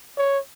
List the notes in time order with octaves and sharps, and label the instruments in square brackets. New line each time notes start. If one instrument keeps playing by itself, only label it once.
[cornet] C#5